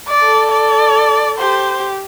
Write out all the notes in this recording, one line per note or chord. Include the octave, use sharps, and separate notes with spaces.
D5
A4
D5
G4 C5